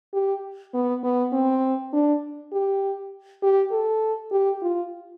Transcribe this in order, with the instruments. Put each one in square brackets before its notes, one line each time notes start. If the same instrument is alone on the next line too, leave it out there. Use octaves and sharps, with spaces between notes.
[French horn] G4
B3
B3
C4
D4
G4
G4
A4
G4
F4